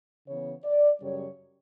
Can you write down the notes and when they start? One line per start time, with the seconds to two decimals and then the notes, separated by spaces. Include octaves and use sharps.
0.27 C#3 E3 B3 C#5
0.64 D5
1.02 F#2 C#3 G3 C#5